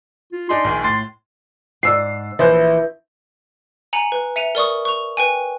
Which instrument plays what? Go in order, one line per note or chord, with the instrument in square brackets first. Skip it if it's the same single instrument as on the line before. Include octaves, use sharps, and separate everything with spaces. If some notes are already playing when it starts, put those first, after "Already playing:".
[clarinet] F4
[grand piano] D4 D#4 G#4 [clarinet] C6
[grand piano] A#1 D#3 G#5
[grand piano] A2 A6 [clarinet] C6
[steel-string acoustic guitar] G#2 [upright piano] D5 E6 C7
[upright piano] A#1 C5 G6 [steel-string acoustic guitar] E3
[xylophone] G#5 A#5 C#7 F#7
B4
E5 C#7 D#7 F7
A#4 D5 C#6 D#6
C#6 F7
B4 G5 G#5